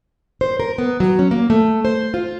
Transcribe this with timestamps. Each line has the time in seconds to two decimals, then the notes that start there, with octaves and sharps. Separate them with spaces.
0.41 C5
0.60 A#4
0.78 B3
1.00 F#3
1.19 C#4
1.31 A#3
1.50 A3
1.85 C5
2.14 F4